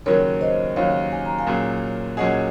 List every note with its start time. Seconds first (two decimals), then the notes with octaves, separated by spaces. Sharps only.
0.06 D#2 C#3 F#3 A#4 C#5
0.41 C5 D#5
0.76 D#2 C#3 F#3 C#5 F5
1.12 G#5
1.25 A#5
1.39 F5 G#5
1.47 A#2 F#3 C#4 G#4
2.17 A#2 F#3 C#4 G#4 D#5 F#5